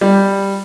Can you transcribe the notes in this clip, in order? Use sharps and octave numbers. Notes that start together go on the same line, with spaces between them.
G3